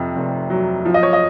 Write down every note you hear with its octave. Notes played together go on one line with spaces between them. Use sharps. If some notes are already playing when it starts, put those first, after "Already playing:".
Already playing: F2 C3
F1
F#3
F3
D#5
C#5
D#5